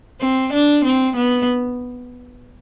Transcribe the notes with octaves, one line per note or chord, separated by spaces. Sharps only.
C4
D4
C4
B3